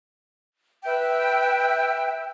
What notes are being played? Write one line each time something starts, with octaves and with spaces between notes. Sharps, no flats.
B4 E5 G5